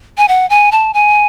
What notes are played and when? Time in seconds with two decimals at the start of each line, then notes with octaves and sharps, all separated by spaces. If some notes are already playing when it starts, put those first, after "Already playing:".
0.18 G#5
0.28 F#5
0.50 G#5
0.72 A5
0.94 G#5